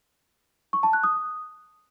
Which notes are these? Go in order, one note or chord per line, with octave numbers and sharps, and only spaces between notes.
C#6
A5
F#6
D#6